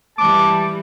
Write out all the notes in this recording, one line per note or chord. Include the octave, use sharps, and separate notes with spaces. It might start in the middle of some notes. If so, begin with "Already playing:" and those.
E3 G3 A5 D6